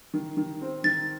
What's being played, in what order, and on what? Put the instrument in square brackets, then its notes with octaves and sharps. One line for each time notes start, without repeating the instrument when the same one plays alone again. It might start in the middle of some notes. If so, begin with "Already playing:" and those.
[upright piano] D#3
D#3
C4
[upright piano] D#3 [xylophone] A6